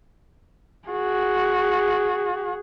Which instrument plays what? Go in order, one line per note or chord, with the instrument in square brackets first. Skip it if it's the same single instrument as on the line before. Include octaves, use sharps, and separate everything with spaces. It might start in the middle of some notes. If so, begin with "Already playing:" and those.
[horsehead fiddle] F#4 G#4